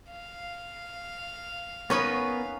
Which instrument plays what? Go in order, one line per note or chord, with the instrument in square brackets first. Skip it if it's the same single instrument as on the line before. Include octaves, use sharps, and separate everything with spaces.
[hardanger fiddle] F5
[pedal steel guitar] B3 A#4 C#6 [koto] C#4 D#4 B4